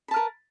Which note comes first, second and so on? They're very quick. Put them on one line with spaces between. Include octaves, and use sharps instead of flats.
B5 A5 B4 A#4